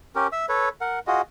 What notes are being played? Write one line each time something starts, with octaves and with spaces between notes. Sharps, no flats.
C#4 G4 A#4
E5 E6
A4 B4 C#5
A#4 F#5
F4 F#4 G#4 D#5